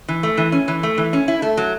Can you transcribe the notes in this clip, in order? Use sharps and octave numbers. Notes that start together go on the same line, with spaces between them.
E3
A3
E3
C#4
E3
A3
E3
C#4
E4
A3
F#3